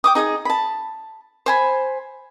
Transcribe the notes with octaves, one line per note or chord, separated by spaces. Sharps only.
G5 D6 D#6
D#4 G#4 F#5 D#6
A5 B5
C5 G#5 B5